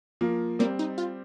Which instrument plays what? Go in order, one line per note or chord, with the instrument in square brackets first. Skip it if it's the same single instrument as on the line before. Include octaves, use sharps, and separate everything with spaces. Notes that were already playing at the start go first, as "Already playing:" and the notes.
[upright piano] F3 A#3
[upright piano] G3 C4 [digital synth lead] A#3
[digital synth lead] D#4
F4